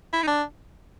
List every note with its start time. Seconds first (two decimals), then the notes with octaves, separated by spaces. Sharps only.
0.13 E4
0.23 D#4
0.27 D4